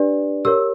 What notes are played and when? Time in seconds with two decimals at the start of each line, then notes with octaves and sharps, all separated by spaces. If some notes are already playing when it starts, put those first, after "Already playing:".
Already playing: D4 G4 B4 D5
0.45 G4 A#4 C#5 E6